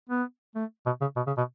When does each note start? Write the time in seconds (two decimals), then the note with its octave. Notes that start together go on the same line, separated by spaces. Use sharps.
0.09 B3
0.55 A3
0.86 B2
1.01 C#3
1.16 B2
1.27 C#3
1.37 B2